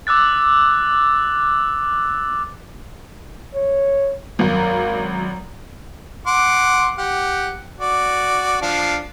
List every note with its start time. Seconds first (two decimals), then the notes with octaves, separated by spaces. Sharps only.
0.07 D6 E6 F#6 A6
3.54 C#5
4.39 G#1 F#2 A#3
6.27 F#5 C6 D6
6.98 G4 F#5
7.78 F#4 D5
8.62 F3 D4 F5